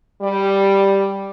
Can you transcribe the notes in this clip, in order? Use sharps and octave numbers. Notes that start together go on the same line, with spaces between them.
G3